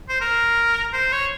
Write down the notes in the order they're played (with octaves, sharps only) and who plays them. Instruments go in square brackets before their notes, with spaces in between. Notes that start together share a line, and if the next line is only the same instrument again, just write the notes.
[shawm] C5
A#4
C5
C#5